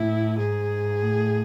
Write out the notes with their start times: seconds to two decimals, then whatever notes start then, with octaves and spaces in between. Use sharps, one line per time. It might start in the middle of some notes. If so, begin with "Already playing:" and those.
Already playing: A2 E4
0.39 G#2 G#4
1.03 A2